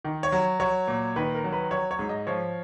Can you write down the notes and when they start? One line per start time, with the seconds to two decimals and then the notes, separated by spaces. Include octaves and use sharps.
0.05 D#3
0.23 C#5
0.32 F#3
0.60 F#3 C#5
0.88 A#2
1.16 D#3 B4
1.35 A#4
1.44 F#3
1.52 B4
1.71 F#3 C#5
1.91 C#5
1.99 G#2
2.09 D#5
2.27 F3 C#5